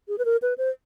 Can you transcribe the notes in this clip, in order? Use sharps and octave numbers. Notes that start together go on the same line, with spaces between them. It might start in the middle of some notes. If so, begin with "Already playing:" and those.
G#4
B4
A#4
B4
C5